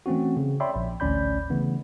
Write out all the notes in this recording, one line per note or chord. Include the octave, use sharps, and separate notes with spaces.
E3 A3 C4 C#4 F#4
C#3
C#5 D5 E5 G5 B5 C6
A#1
A1 D2 C#4 D5 B5 G6
C#3 E3 A3 B3